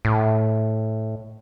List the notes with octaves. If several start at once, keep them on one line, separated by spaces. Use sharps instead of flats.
A2